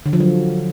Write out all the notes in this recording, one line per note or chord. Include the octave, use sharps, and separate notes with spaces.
D3
F3
F#3